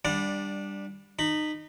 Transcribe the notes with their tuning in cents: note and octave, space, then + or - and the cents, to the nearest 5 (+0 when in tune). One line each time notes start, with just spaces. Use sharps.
G3 +10 D4 +0 F#5 -30
D#4 -25 B5 +0